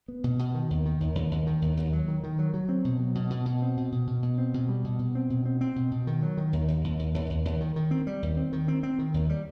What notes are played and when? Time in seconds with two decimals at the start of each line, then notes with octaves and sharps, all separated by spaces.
0.08 B3
0.24 B2
0.39 B2
0.54 D#3
0.70 D#2
0.85 D#3
1.00 D#2
1.15 D#2
1.31 D#2
1.47 D#3
1.62 D#2
1.77 D#2
1.93 F#3
2.08 D#3
2.24 D#3
2.39 F#3
2.54 F#3
2.69 C4
2.85 B2
3.00 F#3
3.15 B2
3.30 B2
3.45 B2
3.62 C4
3.77 B2
3.92 B2
4.07 B2
4.23 B2
4.38 C4
4.54 B2
4.69 G3
4.84 B2
4.99 B2
5.15 C4
5.30 B2
5.46 C4
5.61 C4
5.76 B2
5.92 B2
6.07 D#3
6.22 F#3
6.37 D#3
6.53 D#2
6.68 D#2
6.84 D#2
6.99 D#2
7.14 D#2
7.30 D#2
7.45 D#2
7.61 D#3
7.76 D#3
7.91 C4
8.07 G3
8.23 D#2
8.37 C4
8.53 D#3
8.68 C4
8.83 C4
8.99 D#3
9.14 D#2
9.29 G3